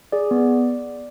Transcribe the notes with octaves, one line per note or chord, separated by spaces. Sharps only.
G#4 D5
B3